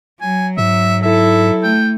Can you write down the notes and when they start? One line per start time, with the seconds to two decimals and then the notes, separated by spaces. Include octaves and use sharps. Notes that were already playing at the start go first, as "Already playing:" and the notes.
0.21 F#3 G#5
0.58 G#2 E5
1.03 E4 A4 E5
1.63 A3 G5